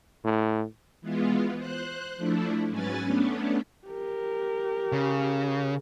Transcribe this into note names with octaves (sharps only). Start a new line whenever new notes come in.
A2
E3 G#3 B3 F4
C5 F#6
F3 A3 D4 E4
G#2 F#3 C#4 B4 G#5 A6
A3 B3 C#4 D4
G4 A#4
C#3